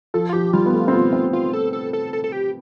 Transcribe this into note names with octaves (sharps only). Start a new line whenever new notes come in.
F3 A4
F4
F3 G4
G3 F4
B3
A3
C4
B3
C4
F4
A4
A4
A4
A4
A4
G4